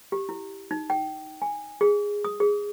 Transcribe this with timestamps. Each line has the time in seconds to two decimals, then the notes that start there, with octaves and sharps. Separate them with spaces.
0.12 G4
0.29 E4
0.71 D#4
0.90 G5
1.42 G#5
1.81 G#4
2.25 D#6
2.40 G#4